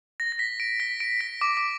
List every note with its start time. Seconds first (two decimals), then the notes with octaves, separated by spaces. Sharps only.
0.20 A#6
0.32 A#6
0.39 B6
0.60 D7
0.80 B6
1.00 D7
1.21 B6
1.41 D6
1.57 D6